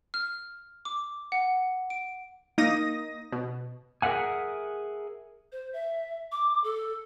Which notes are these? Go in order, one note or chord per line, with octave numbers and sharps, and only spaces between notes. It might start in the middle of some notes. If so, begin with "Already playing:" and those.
F6
D6
F#5
D7
A#3 D#4 D#6 A#6
B2
G#4 A#4 C#5 E5 F#5 G#5
C5
E5
D6
A4